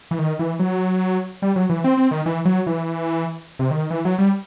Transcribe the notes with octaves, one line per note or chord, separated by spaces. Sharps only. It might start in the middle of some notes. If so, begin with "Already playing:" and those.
E3
D#3
E3
F#3
G3
F#3
E3
C4
C4
D#3
E3
F#3
E3
C3
D#3
E3
F#3
G3